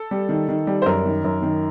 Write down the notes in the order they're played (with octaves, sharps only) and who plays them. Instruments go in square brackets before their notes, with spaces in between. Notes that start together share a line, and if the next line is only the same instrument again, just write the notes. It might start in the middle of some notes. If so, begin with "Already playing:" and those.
Already playing: [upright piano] A4
G3
D#3
D#3
G3
C5
F#2 A#4
D#3
F#2
D#3